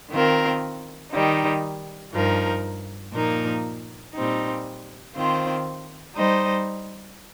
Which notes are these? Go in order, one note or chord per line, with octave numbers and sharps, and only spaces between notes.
D#3 C4 F4 A#4
D#3 G3 D#4
G2 F3 D#4 A#4
A#2 F3 A#3 D#4 A#4
A#2 G3 C4 D#4
D#3 C4 F4 C5
G3 D#4 C5 D#5